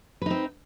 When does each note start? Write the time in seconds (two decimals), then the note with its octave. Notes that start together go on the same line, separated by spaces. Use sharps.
0.22 B4
0.26 D#4
0.30 C4